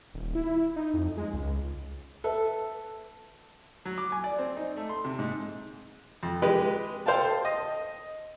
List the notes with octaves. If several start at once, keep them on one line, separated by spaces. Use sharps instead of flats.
D#1
E4
D#4
F2
G#3
C#2
A4 B4 E5
F#3
D6
G#5
D5
C4
D#4
A3
C6
C3
G#2
F2
G#3 G4 B4
A4 C5 F5 G5 A5
D#5